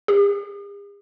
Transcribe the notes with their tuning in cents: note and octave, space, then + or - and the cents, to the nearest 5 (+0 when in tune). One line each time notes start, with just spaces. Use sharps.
G#4 -45